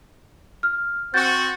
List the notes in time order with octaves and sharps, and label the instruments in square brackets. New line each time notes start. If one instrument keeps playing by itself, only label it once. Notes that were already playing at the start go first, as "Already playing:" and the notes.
[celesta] F6
[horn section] C4 F#4 [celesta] G6 A6